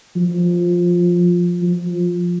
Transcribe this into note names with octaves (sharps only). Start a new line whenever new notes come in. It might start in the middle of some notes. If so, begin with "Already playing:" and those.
F3
F3